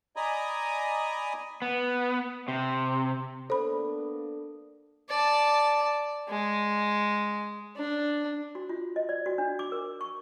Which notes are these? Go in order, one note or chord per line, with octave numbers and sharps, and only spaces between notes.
D5 D#5 G#5 A#5 B5 D#6
B3
C3
A#3 B3 D4 A4 C5 B5
D5 A5
G#3
D4
F#4
F4
D#5
D5
F#4
D4
D6
A#4
C#6